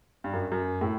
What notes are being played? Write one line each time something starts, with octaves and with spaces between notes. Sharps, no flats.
G2
F#2
F#2
A2